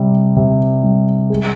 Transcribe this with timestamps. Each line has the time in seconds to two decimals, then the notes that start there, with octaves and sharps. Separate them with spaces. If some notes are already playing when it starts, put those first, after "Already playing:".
Already playing: C3 G3
0.36 C3
0.84 G3
1.30 G#3